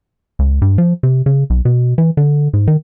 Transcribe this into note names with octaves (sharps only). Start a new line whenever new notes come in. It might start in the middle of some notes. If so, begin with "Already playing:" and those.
C#2
G2
F3
C3
C#3
B1
B2
E3
D3
G#2
D#3